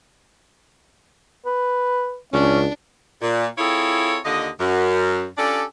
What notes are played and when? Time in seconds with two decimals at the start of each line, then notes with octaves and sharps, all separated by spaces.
1.46 B4
2.33 C#2 C#4 D4
3.22 A#2
3.58 C4 E4 F4 G#4 A4 C#5
4.24 D#2 D3 F4 D#5
4.59 F#2
5.38 C#4 D4 F4 G4 A4 D5